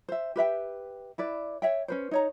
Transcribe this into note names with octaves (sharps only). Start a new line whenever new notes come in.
C5 E5
G4 B4 E5 G5
E4 B4 D5
C#5 E5 G5
C#4 B4 C5
D#4 C#5 A#5